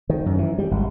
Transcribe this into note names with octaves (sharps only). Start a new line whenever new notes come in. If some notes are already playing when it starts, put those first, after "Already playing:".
D#3
F#2
E3
G3
G#1